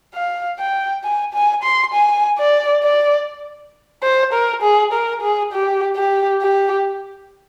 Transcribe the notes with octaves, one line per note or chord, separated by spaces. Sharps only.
F5
G5
G#5
G#5
C6
G#5
D5
D5
C5
A#4
G#4
A#4
G#4
G4
G4
G4